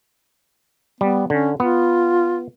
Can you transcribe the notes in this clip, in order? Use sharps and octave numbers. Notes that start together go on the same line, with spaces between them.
G3 B3
D3 C#4
B3 F4